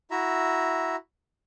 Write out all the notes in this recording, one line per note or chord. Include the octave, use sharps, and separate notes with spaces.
E4 F#4 E5 A#5